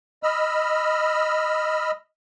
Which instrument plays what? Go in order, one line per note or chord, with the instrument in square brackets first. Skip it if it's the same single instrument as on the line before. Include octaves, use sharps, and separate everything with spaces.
[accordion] D#5 B5 E6 F6